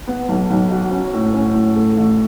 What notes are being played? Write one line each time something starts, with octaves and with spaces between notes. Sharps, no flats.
B3
B1
B1
F#4
C#4
A2
C#4
A2
A3
A1